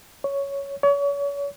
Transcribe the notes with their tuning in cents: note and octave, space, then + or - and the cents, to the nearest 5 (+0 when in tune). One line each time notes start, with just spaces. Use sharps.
C#5 +5
C#5 +35